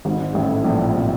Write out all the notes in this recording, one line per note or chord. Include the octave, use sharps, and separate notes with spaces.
G#1 G#2
A1 A2
A#1 A#2
C3